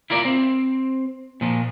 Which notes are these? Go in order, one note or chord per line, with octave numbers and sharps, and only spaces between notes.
E4 F4 A#4 D5
C4
A#2 F3